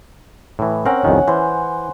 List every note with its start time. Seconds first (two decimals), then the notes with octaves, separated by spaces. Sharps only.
0.59 A2 E3
0.85 C4 C#4 A#4 F#5
1.04 C2 F2 D#3
1.28 E3 C5